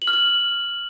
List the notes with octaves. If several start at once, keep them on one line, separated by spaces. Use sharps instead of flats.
F#7
F6
F#7